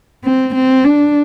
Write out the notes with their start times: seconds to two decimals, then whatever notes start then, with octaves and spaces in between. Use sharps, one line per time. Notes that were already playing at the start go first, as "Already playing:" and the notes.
0.25 C4
0.55 C4
0.84 D4